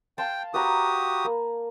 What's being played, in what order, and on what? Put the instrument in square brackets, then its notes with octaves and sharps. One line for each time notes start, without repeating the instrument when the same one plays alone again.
[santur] F5 A5 C6 [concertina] G5
[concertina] F#4 G4 D#6 [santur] B4 A#5
[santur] A#3